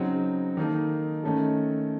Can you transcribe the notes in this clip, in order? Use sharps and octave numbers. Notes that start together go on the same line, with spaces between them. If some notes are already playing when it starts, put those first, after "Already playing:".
Already playing: C#3 F#3 C4 D#4
D#3 A#3 D#4 A4
D#3 A3 C#4 A4